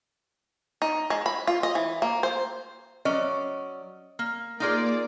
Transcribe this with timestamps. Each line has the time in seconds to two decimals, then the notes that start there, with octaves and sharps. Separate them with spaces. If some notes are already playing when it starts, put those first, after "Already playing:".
0.82 D#4
1.10 G#3
1.26 B5
1.47 F4
1.63 D#5
1.75 E3
2.02 A#3
2.23 C5
3.05 F#3 C#4 D5 D#5
4.19 A#3
4.60 A#3 D#4 F4 G#4 D5